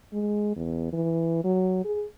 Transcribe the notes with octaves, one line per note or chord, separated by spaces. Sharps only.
G#3
E2
E3
F#3
G#4